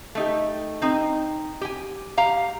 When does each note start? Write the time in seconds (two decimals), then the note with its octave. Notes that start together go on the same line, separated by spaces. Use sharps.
0.15 A3 D#4 G4
0.82 C4 D#4
1.61 G4 G#5
2.17 G4 F5 A#5